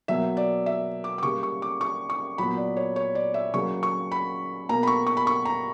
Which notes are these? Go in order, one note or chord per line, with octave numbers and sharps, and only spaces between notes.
B2 F#3 A#3 E5
D5
E5
D6
D6
C#3 G3 A#3 C#6
C#6
D6
C#6
C#6
A#2 F#3 B3 B5
D5
C#5
C#5
D5
E5
C#3 F#3 A#3 C#6
C#6
B5
B2 A#3 A#5
B5
C#6
C#6
B5
C#6
A#5